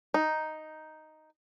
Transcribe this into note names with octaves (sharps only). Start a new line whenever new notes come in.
D#4